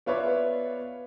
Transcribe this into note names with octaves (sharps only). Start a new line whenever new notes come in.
B3 F4 B4 C#5 D5 E5